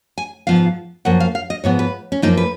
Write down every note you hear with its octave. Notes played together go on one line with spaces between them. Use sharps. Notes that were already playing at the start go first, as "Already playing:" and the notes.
G#5
G#2 F3 B3 F5
F#2 F3 A#3 F#5
F5
F5
D#5
G#2 F3 B3 C#5
B4
C#4
F#2 F3 A#3 D#4
B4